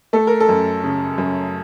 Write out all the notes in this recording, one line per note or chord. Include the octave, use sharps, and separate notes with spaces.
A3 A4
A#4
A4
F#2
C#3
F#2